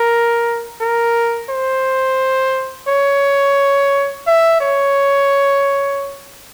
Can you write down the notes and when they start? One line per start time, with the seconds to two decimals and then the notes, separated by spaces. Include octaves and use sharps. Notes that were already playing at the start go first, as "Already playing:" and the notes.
Already playing: A#4
0.81 A#4
1.49 C5
2.88 C#5
4.27 E5
4.60 C#5